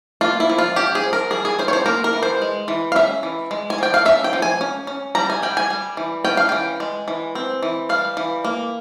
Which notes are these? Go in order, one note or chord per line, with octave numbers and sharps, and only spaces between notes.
A#3 F4
E4
F3
F4
C#4 G4
G#4
F3
A#4
G3 G#4
G#4
C#4 C5
C#5
C5
A#3 A#4
A#4
E3
C5
G#3
E3
F5
C#4 E5
E3
G#3
G#5
F3 G5
F5
C#4 E5
G5
F3
G#5
C#4
C#4
G3 A#5
G#5
G3 G5
G#5
G3
E3
C#4 G5
F5
E3 G5
G#3
E3
C4
E3
G3 F5
E3
A#3